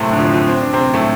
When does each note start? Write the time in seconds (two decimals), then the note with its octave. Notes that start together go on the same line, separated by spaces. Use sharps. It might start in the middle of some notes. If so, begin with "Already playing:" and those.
Already playing: A2 C3 A3 C4
0.13 D3
0.18 F2 F3
0.34 F2 F3
0.49 C4
0.61 D4
0.73 C3 C4
0.94 A2 A3